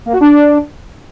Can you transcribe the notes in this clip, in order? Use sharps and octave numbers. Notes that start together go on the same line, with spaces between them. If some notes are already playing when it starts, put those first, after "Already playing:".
A#3
F#4
D4